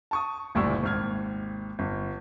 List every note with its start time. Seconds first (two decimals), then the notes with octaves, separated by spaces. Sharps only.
0.11 A5 C#6 D#6
0.55 F#1 D2 A#2 G3 C#6 E6
0.83 G#1 D#2 F6 G#6
1.79 G1